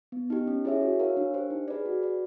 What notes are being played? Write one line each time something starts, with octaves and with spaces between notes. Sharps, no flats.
B3
D#4 G4
C#4
E4 G#4 C#5 E5
F#4
A#4 C#5 F5
D4
G4 C5
D#4
G#4 B4 D5
F#4
B4 D5